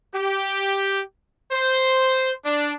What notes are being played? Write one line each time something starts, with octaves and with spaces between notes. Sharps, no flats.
G4
C5
D4